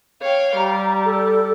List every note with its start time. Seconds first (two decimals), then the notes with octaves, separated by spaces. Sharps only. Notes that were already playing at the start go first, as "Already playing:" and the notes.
0.22 C#5 F5 G5
0.57 G3 A#5
1.05 A4